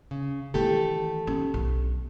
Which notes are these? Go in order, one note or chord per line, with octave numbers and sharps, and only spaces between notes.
C#3
D#3 E3 A3 G4 A4
C#4
B1